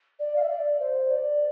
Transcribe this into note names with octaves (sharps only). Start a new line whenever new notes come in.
D5
F5
E5
D5
C5
D5